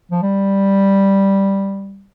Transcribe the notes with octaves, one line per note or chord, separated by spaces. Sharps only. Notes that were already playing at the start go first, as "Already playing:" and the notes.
F3
G3